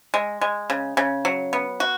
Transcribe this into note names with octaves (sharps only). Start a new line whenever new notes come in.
G#3
G#3
C#3
C#3
F#3
B3
F#4